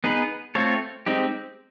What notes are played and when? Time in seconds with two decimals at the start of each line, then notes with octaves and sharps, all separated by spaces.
0.04 B3 D#4 G#4 B4
0.55 A3 C4 F4 A4 C#5
1.06 G#3 C4 D#4 G4